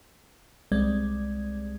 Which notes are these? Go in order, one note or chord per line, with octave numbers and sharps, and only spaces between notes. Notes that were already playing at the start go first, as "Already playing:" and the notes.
C2 G3 G#3 C4 D5 G#6